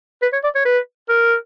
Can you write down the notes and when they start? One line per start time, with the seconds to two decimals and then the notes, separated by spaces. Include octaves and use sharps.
0.22 B4
0.33 C#5
0.44 D5
0.55 C#5
0.65 B4
1.09 A#4